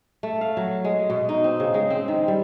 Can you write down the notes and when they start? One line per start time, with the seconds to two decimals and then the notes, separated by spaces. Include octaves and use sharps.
0.23 A3
0.41 F5
0.57 F#3
0.85 G#3
1.10 B2
1.29 D#4
1.44 C4
1.60 C#3
1.74 G#3
1.90 C4
2.08 D#3
2.28 G3